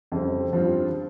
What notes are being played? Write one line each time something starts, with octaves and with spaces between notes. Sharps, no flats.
F2 C#3 G3 C4
G2 F3 C4 F4
F3